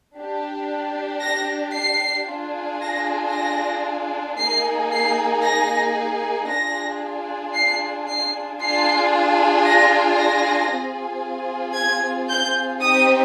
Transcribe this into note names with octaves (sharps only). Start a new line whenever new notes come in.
D4 G4
A#6
C7
D4 F4 G#4
A#6
A#6
A#3 D#4 G#4 C7
C7
A#6
D4 F4 G#4 A#6
C7
C7
D4 F4 G#4 C7
A#6
A#6
C4 F4 G#4
G#6
G6
C4 D#4 G4 D#6